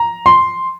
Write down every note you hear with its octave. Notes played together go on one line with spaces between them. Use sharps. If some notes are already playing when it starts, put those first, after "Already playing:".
Already playing: A#5
C6